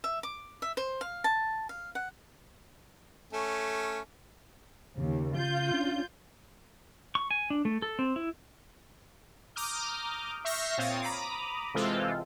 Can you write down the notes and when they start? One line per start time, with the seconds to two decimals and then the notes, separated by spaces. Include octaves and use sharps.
0.04 E5
0.23 D6
0.62 E5
0.77 C5
1.01 F5
1.24 A5
1.69 F5
1.95 F#5
3.33 A3 C#4
4.98 D#2 C#3
5.36 F4 G6
5.73 C#4 D4
7.15 C#6
7.31 G#5
7.50 D4
7.65 A3
7.82 A4
7.99 C4
8.16 E4
9.56 A#5 D6 D#6 F6 G6
10.45 E5 C#6 F6 G6 A#6 C7
10.78 A#2 C4 C#5 F5 D#6 A6
11.02 A#5 B5 D6 D#6
11.74 C3 E3 G#3 C4 F4 A4